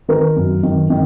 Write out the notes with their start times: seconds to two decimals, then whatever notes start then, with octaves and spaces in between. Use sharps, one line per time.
0.08 D#3 A#4
0.36 F#2
0.63 D#3
0.90 D#3